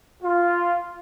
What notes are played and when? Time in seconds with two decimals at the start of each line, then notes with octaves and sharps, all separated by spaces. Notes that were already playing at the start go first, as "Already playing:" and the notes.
0.22 F4